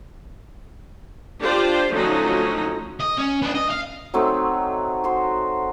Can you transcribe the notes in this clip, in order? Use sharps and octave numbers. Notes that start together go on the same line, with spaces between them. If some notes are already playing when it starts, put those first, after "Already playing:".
D4 F4 G4 C5 D5
D3 F3 F#3 A3 C#4 D#4
D#5
C#4
B3 D4
D#5
F5
F#3 A3 C4 D#4
F#4 C5